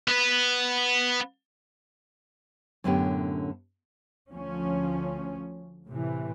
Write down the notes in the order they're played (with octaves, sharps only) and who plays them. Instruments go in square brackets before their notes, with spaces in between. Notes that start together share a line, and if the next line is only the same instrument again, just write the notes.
[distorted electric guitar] B3 B4
[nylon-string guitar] F#2 A2 D3 B3 C#4 G4
[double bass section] D2 F3 C#4
A2 C3 E3